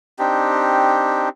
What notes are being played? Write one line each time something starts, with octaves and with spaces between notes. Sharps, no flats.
C4 D4 D#4 G4